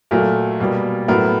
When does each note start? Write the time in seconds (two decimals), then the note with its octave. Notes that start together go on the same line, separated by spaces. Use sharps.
0.11 A#2 F#3 A3 A#4
0.60 B2 G3 A#3
1.08 A2 F#3 B3 A#4